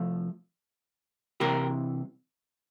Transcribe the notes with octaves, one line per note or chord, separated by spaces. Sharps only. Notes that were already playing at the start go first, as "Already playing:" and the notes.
Already playing: C2 F3 A3
C2 C3 E3 G4 A#4